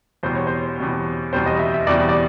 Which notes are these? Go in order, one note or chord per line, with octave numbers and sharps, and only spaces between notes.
E2 B2 G3 C5
C#5
C5
E2 B2 G3
E2 B2 G3 C5
D#5
E5
E5
E2 B2 G3 D5
D5